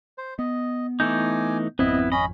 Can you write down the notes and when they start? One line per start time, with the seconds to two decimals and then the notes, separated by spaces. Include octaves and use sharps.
0.18 C5
0.39 B3 D#5
1.00 E3 A3 D#4 G#5 D6 G6
1.79 G#1 F2 B3 C4 E4 D#5
2.12 C#4 D#5 B5